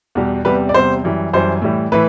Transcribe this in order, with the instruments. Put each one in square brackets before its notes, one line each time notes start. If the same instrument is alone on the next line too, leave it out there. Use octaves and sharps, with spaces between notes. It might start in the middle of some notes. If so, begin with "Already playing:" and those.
[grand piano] E2 B2 G3
E2 C3 G3 B4
D5
E2 C3 G3 C5
F#2 E3 G3
F#2 E3 G3 C5
A2 E3 G3
A2 E3 B4